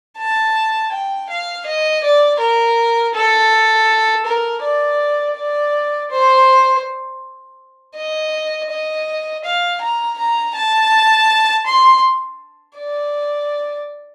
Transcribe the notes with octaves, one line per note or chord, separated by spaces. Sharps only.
A5
G5
F5
D#5
D5
A#4
A4
A#4
D5
D5
C5
D#5
D#5
F5
A#5
A#5
A5
C6
D5